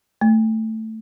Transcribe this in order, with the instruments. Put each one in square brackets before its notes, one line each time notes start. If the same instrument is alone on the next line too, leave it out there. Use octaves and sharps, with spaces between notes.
[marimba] A3